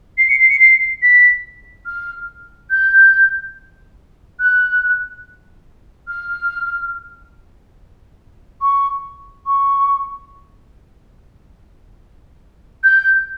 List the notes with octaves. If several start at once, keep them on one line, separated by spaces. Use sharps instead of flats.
C7
C#7
C7
C#7
C7
B6
F6
G6
F#6
F6
C#6
C#6
G6